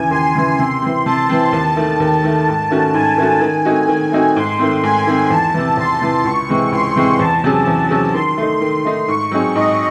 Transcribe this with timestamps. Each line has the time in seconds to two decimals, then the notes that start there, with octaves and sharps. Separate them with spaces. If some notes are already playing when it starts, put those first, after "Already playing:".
Already playing: D#2 C#3 E3 G#5
0.11 D#2 C6
0.35 C#3 E3
0.59 C3 C6
0.82 E3 C4
1.05 C3 A5
1.29 E3 C4
1.52 D#2 A5
1.76 D#3 A3
2.00 D#2
2.24 D#3 A3
2.48 G#2
2.71 D#3 A3 C#4 F#4
2.94 G#2 G#5
3.18 D#3 A3 C#4 F#4
3.41 D#3
3.65 A3 C4 D#4 F#4
3.88 D#3
4.12 A3 C4 D#4 F#4
4.36 G#2 C6
4.59 D#3 A3 C4
4.83 G#2 G#5
5.07 D#3 A3 C4
5.30 E2 A5
5.54 C3 E3
5.77 E2 C6
6.02 C3 E3
6.25 C#2 C#6
6.49 C3 E3 G#3 C4
6.72 C#2 C6
6.96 C3 E3 G#3 C4
7.19 E2 A5
7.44 C3 F#3 C#4 G#4
7.67 E2
7.90 C3 F#3 C#4 G#4
8.14 D#3 C6
8.38 A3 D#4
8.61 D#3 C6
8.85 A3 D#4
9.08 G#2 C#6
9.31 F#3 C4 D#4 G#4
9.55 G#2 D#5